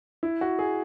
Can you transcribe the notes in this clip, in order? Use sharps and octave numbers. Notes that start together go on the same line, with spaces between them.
E4
F#4
G#4